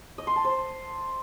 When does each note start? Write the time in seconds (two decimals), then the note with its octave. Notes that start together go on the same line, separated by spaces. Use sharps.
0.18 D#5
0.27 C6
0.36 A5
0.44 C5